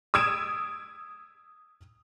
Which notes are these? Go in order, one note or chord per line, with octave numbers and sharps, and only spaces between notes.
D#6 E6 G#6 D7 E7